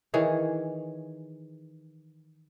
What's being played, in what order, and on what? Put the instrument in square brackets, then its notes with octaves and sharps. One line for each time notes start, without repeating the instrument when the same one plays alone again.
[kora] D#3 E3 G#4 C#5